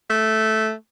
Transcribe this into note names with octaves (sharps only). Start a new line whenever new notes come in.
A3